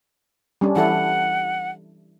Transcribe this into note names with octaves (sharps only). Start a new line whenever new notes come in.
G3 C#4 D4
E3 E4 A4 F#5